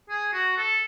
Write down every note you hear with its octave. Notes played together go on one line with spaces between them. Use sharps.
G#4
F#4
A4